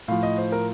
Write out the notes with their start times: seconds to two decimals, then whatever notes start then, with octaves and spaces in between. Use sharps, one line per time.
0.08 A2 F3 F5
0.23 D#5
0.38 C5
0.52 A#4